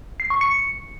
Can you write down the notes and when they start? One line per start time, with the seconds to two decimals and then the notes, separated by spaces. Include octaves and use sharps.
0.20 C7
0.30 C#6
0.41 C#7